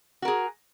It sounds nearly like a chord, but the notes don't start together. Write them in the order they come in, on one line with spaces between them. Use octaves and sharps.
F#4 A#4 G#4